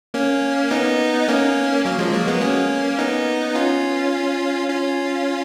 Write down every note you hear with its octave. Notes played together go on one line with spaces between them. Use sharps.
A#3 C#4
B3 D#4
A#3 C#4
F#3 A#3
F3 G#3
F#3 A#3
G#3 B3
A#3 C#4
B3 D#4
C#4 F4
C#4 F4